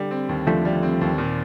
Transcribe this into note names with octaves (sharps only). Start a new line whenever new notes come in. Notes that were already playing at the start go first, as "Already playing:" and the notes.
Already playing: D3 G3
C4
D#2
D3 F3 A3
G3
C4
D#2
A#2